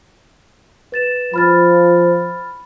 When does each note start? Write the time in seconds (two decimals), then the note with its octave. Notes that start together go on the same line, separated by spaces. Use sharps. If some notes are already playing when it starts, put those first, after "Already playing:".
0.92 B4 A6 E7
1.34 F3 B5 F6 A6